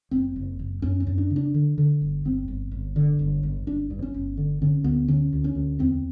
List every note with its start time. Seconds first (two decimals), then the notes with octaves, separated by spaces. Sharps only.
0.11 F#1 C4
0.36 F#1
0.59 F#1
0.82 F#2 C#4
1.00 C#4
1.07 F#2
1.18 D4
1.30 C#3
1.36 D4
1.54 D3
1.78 D3
2.02 G1
2.25 G1 C4
2.48 G1
2.71 G1
2.96 D3
3.19 G1
3.43 G1
3.66 G1 D4
3.90 G2
4.02 C#4
4.14 G1
4.37 D3
4.62 D3 C#4
4.84 D2 B3
5.08 D3 C#4
5.33 D2
5.44 C#4
5.55 D2
5.79 E2 C4